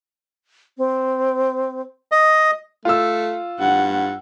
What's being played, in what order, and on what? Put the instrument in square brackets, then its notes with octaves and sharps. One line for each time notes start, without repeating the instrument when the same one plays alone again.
[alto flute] C4
[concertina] D#5
[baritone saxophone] A3 [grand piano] F4 E6
[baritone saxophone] G2 [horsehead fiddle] F#5